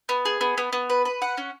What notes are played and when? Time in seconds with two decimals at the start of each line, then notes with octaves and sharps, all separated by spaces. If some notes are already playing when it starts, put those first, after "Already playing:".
0.09 B3
0.25 G#4
0.41 B3
0.58 B3
0.73 B3
0.90 B4
1.05 B4
1.22 F#5
1.38 C#4